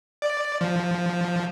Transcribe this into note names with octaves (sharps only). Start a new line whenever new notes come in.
D5
F3